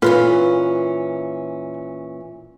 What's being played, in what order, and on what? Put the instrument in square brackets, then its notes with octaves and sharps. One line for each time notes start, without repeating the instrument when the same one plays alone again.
[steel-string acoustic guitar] A#2 E3 C#4 [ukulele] F4 B4